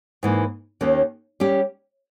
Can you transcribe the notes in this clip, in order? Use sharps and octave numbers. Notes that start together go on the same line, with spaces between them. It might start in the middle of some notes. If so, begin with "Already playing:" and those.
G#2 E3 A#3
D#2 D#3 A#3 C#4
G3 C#4 G4